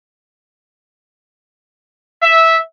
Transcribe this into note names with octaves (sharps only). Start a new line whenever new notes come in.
E5